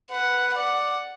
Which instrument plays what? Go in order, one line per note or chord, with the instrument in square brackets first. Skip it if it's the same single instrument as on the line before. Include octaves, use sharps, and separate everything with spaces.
[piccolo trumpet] B4 [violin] F#5
[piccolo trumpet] D5 [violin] F#5